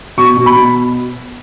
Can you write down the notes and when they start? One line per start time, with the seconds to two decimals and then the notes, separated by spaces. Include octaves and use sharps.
0.17 B2 C#6
0.37 B2
0.46 B5
0.55 B2